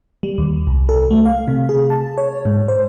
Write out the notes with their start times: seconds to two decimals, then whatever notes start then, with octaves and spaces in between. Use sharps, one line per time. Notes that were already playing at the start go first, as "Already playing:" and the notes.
0.23 G3
0.38 D#2
0.67 C2
0.89 A4
1.11 A3
1.25 F5
1.48 C3
1.69 G#4
1.90 A5
2.18 C#5
2.45 G#2
2.68 C5